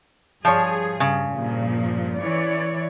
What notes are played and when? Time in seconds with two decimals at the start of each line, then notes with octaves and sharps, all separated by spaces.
0.45 G2 F3 G#4 C#5
1.00 G2 C#3
1.33 G2 A#2 F3
2.19 E3 C#5 D5